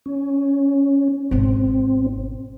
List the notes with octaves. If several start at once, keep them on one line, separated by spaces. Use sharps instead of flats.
C#4
G#1 B2 C4